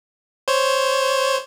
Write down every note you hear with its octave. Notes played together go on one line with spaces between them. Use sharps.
C5 C#5